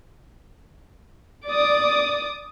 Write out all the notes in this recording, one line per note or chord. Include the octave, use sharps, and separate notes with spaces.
D5 D6 D#6